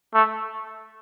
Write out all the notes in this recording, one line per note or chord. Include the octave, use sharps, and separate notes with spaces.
A3